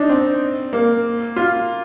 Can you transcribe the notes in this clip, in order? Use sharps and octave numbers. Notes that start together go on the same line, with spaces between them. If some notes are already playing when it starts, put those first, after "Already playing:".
Already playing: D4 D#4
C4
A#3
F4